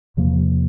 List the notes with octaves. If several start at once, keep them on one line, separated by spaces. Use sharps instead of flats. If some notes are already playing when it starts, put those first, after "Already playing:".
E2 C3 F3 A#3